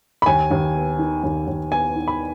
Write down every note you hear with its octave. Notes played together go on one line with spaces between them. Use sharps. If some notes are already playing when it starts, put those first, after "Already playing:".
B5
D#2 G#5
D#2
B3
D#3
D#2
D#2
B3 G#5
D#3
B5